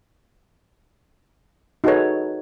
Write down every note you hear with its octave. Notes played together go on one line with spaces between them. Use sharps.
D#4 F#4 G#4 A4 B4 C#5